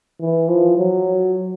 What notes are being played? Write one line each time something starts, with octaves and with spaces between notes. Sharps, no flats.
E3
F3
F#3